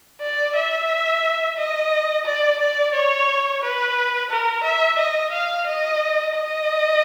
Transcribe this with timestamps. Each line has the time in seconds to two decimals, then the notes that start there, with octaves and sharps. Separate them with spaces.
0.21 D5
0.56 E5
1.57 D#5
2.26 D5
2.60 D5
2.94 C#5
3.62 B4
4.30 A#4
4.64 E5
4.99 D#5
5.32 F5
5.67 D#5
6.34 D#5